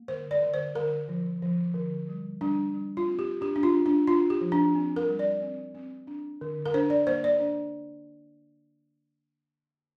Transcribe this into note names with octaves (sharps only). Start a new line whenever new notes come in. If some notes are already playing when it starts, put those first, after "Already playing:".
Already playing: A#3
D3 C5
D5
D3
C5
D3 A#4
F3
F3
D3
G3
G3 D4
G3
F4
C4
G4
D4 G4
D4
F4
D4
D4
D4 F4
G4
F3
D4
C4
A#4
G3
D5
C4
C4
D4
D3
A#4
D4 C5
D5
A#3 C5
D5
D4